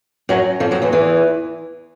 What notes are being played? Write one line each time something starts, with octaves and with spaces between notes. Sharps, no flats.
F#2 F#3
F2 F3
F#2 F#3
E2 E3
E2 E3